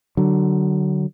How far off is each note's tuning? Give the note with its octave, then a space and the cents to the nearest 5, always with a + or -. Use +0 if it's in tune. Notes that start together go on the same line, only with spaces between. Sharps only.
D3 +10 F#3 +25